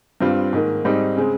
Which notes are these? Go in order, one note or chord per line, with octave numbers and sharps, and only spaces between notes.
G2 G3 C4 F4
G#2 D#3 A#3
G#2 G3 C4 D#4
C#3 G#3 C4